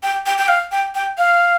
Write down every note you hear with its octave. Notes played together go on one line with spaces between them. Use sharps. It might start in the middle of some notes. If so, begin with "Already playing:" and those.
G5
G5
G5
F5
G5
G5
F5